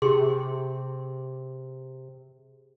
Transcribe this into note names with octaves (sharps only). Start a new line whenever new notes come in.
C3 G4 G#4 C6